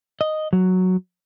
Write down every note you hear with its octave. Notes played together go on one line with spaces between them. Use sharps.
D#5
F#3